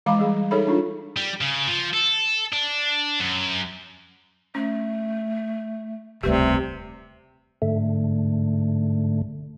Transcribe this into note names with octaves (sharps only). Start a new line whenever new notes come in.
E3 G#3 F5 A#5 B5 D6
G3 G#4
D#4 G#4 A4 C#5 E5 B5
D4 D#4 F4
G3
C#3
F3
A4
D4
F#2
A3 C#4
D#1 C#2 C3 G3 A3 G4 B4 D5
G#2 D3 A3